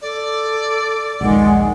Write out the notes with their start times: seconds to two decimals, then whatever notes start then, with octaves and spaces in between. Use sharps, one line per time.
0.01 A4 D5
1.21 A#1 D#2 D#3 G#3 F#5